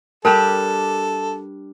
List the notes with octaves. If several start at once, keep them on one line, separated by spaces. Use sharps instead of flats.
G3 D4 G4 A4 A#4 A5